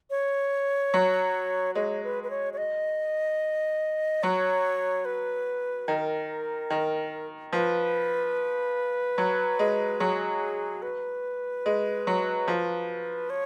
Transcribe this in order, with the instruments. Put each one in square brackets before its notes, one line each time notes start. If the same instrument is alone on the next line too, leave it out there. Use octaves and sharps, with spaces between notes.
[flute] C#5
[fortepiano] F#3
[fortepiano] G#3 [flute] C#5
[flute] B4
B4
C#5
C#5
D#5
[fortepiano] F#3 [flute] C#5
[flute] B4
[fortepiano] D#3 [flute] A#4
[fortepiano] D#3
[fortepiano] F3 [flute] B4
[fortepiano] F#3
G#3
[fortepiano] F#3 [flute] G#4
[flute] B4
[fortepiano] G#3
F#3
F3
[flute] C#5